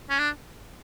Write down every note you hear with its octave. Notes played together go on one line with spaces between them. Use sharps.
C#4
D4